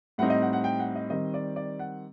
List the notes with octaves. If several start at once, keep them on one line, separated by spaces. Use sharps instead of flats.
A2 G3 C4 D#4 F#5
D#5
F#5
F#5
G5
F#5
D#5
D#3 G3 C4 D#5
D5
D5
F#5